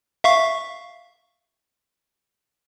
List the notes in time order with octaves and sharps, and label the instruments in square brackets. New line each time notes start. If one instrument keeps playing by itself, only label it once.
[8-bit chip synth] E5 F5 C#6